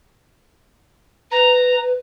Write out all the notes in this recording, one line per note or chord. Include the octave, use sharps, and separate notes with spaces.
B4 A#5